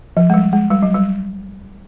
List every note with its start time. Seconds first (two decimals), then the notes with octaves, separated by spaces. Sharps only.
0.17 F3
0.30 G#3
0.34 G3
0.53 G#3
0.70 G3
0.83 F#3
0.95 G3